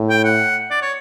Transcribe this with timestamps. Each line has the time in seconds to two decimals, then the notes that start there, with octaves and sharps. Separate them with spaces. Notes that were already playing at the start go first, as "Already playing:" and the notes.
Already playing: A2
0.10 G5
0.24 F#5
0.71 D5
0.82 C#5